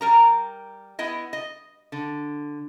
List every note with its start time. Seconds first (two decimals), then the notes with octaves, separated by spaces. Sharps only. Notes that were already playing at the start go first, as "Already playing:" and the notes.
0.01 G3 A#4 A#5
0.99 B3 E4 D#5
1.33 D#5
1.92 D3